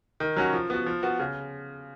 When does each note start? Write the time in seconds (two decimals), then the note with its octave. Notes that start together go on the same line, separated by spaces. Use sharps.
0.20 D#3
0.36 F#3 C#4 F#4
0.53 F3
0.70 B3 F#4
0.86 F3
1.03 B3 F#4
1.19 C#3